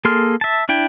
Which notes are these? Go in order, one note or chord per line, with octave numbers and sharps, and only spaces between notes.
A#3 G#4 A4 C6 F6
E5 A5
D4 E4 G5